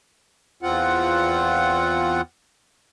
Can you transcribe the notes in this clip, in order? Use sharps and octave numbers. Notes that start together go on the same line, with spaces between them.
E2 C4 F4 F#5